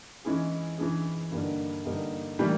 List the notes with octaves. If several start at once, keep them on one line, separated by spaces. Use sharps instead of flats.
E3 G#3 C#4 E4 G#4
E3 G#3 C#4 E4 G#4
G2 D3 G3 A#3 D#4
G2 D3 G3 A#3 D#4
A2 E3 G3 A#3